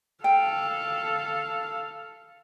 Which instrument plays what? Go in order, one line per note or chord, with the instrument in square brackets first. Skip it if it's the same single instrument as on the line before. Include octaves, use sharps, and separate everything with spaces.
[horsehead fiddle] A4 F5 [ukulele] G5